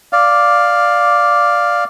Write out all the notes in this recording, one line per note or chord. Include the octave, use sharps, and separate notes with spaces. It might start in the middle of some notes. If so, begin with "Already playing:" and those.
D5 F5